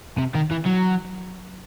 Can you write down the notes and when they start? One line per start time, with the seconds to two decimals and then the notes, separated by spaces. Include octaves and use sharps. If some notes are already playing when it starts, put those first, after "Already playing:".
0.18 C3
0.35 D#3
0.51 E3
0.66 F#3